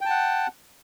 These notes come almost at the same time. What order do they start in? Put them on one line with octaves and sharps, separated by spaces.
G5 A5 F#5